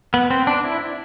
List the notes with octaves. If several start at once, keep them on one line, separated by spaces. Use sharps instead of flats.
B3
C4
D4
E4